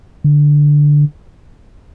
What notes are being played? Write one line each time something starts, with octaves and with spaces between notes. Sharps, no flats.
D3